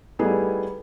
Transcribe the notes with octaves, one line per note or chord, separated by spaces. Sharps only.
G3 A3 B3 D#4 E4 G#4